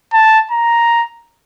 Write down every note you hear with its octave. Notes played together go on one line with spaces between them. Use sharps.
A5
A#5